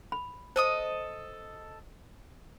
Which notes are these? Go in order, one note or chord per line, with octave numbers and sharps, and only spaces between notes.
B5
A4 C5 D#5 D#6